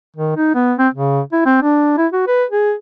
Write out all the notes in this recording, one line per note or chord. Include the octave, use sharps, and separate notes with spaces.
D#3
D#4
B3
C4
C#3
E4
C4
D4
E4
F#4
B4
G#4